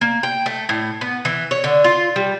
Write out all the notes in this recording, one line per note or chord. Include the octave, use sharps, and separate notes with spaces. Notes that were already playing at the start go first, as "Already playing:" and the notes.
A#3
G5
A3
A2
B3
E3
C#5
D3
F4
G3